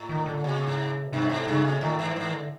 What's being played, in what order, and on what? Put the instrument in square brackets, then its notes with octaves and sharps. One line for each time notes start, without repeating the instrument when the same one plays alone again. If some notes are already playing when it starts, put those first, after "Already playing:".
Already playing: [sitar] A2
[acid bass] D#3
D3
[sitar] A#2 [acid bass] C#3
[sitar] G#2
[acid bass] B2
[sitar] G2 [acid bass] C3
[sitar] A2
G#2
[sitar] G2 [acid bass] C#3
[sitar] A#2
[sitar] A2 [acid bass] D#3
[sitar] G#2 [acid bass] E3
[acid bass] F3
[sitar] G#2 [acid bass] E3
[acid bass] D#3
D3